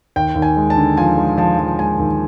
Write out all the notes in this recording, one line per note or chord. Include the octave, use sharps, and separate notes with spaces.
D#2 G5
D#2
G#5
G#3
A5
D3
F3 G#5
G#3
F3 A5
F3
G#3 G#5
D#2